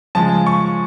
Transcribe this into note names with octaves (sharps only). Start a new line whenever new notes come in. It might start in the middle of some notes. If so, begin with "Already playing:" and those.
C#3 F3 G#3 A5
C#6